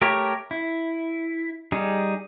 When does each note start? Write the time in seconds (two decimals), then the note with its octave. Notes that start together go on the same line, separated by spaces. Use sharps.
0.02 A3 G4 A#4 C#5
0.51 E4
1.72 G3 D#4 G#4